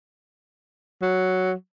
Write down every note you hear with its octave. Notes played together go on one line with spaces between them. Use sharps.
F#3